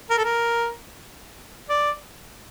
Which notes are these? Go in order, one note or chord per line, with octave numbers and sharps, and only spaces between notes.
A#4
A4
A#4
D5